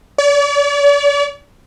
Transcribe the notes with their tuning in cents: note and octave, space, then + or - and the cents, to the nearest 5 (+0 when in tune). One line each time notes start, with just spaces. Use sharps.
D5 -45